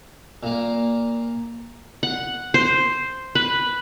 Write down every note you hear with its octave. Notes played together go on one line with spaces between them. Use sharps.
A#2 A#3
F#5
C5
B4